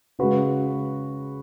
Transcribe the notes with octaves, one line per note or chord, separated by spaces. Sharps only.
C#3 G#3 F#4 B4